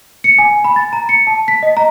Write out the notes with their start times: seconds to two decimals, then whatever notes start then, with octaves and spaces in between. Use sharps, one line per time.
0.24 C#7
0.39 G#5
0.64 B5
0.76 A6
0.93 A#5
1.09 C#7
1.27 A5
1.48 B6
1.63 D#5
1.77 A#5